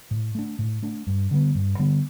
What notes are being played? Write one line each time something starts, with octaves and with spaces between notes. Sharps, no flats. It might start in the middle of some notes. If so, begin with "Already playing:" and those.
A2
A3 D4
A2
A3 D4
G2
D3 G3 B3
G2
D3 G3 B3